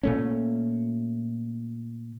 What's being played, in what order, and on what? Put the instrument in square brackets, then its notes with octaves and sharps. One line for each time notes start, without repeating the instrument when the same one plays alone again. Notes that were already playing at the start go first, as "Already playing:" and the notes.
[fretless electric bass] A#2 A3 C#4